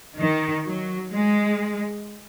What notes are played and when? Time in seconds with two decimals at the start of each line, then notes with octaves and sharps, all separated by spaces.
0.18 D#3
0.65 F#3
1.11 G#3